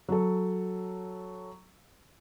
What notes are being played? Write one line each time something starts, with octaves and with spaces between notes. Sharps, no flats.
F#3 A4